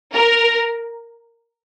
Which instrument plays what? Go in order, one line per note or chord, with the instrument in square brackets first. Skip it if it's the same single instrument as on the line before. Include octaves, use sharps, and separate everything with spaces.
[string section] A#4